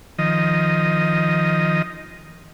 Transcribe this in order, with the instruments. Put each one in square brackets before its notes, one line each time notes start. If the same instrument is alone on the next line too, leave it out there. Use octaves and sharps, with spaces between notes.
[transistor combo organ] D#3 F3 D#5